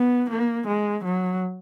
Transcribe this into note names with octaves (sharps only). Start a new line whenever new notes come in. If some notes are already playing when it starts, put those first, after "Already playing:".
Already playing: B3
A#3
G#3
F#3